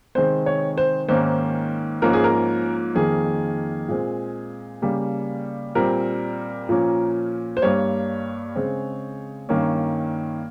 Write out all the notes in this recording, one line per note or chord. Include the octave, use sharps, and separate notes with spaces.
C3 D#3 G#3 C4 C5
C#5
C5
G#2 D#3 A#3 C#4 C5
G#2 F3 A#3 C#4 A#4
G#4
A#4
F2 D#3 A#3 G#4
A#2 G#3 C4
C#3 G3 A#3
A#2 G3 C4 A#4
A#2 F3 A#3 C#4
C5
G2 G3 A#3 C#5
C#3 G#3 C4
G2 D#3 A#3 C#4